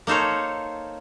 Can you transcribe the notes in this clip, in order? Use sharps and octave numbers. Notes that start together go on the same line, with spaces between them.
A#3 D#4 A4 C5 C#5